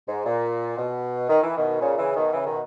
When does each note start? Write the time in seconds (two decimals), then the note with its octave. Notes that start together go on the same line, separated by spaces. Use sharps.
0.08 G#2
0.26 A#2
0.78 B2
1.30 D#3
1.43 E3
1.57 B2 D#3
1.81 A#2 C#3
1.99 C#3 E3
2.16 B2 D#3
2.34 C#3 E3
2.46 B2 D#3